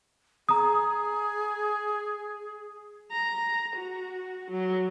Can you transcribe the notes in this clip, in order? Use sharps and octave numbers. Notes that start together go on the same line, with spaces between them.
G#4 A#5 D#6
A#5
F#4
F#3